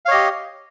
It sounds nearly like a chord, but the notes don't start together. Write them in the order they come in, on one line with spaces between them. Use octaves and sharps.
F5 C#5 D#5 G4